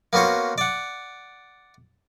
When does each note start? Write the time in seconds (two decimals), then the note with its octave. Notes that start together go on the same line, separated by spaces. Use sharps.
0.13 A#3 B3 C#4 F#4 C5
0.58 D5 F#5